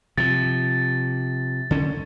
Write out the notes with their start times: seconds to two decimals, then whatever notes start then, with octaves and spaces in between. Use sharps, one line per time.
0.18 C3 F3 A6
1.71 D3 C#4